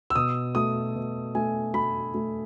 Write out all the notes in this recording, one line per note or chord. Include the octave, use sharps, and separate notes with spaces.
E6
B2 D#6
A3 D#6
B2
A3 G#5
A3 B5
A3